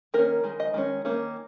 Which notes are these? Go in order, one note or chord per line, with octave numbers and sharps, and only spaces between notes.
D#3 A#3 C#4 A#4
D#3 G#3
D#5
D#3 G#3 C#4
D#3 A#3 C#4